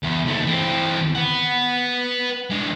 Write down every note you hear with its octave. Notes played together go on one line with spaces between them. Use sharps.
E2
D#2 A3
E3 C4
B4 F#5
G#3 D4